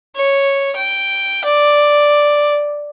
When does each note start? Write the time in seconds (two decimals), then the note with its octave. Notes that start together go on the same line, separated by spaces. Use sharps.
0.16 C#5
0.77 G5
1.45 D5